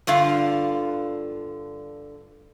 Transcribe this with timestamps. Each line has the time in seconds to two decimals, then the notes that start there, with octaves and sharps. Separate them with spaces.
0.07 G2 D3 F4 F5